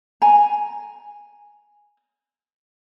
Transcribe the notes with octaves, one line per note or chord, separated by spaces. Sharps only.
G#5 A#5